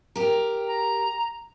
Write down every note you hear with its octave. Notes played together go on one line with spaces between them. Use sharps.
G4 A#4
A#5